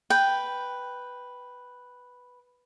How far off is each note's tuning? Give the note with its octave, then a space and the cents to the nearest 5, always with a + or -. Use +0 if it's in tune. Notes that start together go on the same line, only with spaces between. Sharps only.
B4 +0 G5 +0